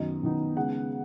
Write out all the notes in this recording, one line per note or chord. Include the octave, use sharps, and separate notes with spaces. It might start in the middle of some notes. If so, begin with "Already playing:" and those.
Already playing: F#2 D#3 B3 D#4 D#5
F#2 D#3 B3 D#4
C#3 G#3 B3 F#5